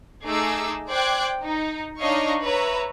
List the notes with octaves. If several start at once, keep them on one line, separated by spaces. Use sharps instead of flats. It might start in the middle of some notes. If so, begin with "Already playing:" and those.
A3 D#4 G#4 D6 E6
C5 D5 G5 D6 F#6 G#6
D#4
D4 D#4 C#5 D#5 F5 C#6
B4 C#5 E5 A#5